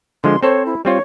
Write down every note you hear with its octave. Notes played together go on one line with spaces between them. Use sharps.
D3 F3 G#3 C6
C4 A4 C5 C#5
E4
G3 C4 F4 C#5